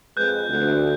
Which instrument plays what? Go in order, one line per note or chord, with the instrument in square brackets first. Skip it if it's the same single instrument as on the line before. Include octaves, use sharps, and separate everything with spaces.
[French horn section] F2 G#3 B4 [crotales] F#6 G6
[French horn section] D2